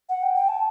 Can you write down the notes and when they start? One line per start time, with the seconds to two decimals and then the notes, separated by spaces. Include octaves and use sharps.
0.09 F#5
0.23 G5
0.35 G5
0.48 A5